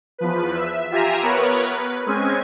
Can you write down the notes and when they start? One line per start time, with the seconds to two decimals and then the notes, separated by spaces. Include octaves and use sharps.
0.18 E2 F3 B4
0.55 E5
0.91 F4 G4 E5 G#5 A#5
1.22 B3 A#4 B4 C#5
1.70 B4
2.06 G#3 C4 C#4 G#5